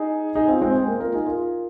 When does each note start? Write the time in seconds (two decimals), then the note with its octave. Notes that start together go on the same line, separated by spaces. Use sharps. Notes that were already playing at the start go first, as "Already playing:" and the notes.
Already playing: D#4 G#4
0.35 D#4 G#4
0.48 C4 F4
0.61 G#3 C4
0.75 G#3
0.88 A#3
1.00 F4 A#4
1.13 D#4 G#4
1.27 F4 A#4